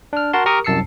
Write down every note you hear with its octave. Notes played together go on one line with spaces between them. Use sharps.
D4 F6
F#4 A#4 F#5 A5 C6
G4 A#4 A#5 C#6 D#6
C2 F#2 A5 E6 C7 C#7